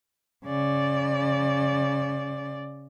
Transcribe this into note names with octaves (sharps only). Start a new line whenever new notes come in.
C#3 D5